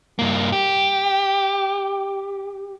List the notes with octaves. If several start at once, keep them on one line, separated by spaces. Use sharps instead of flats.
G2 A#3
G4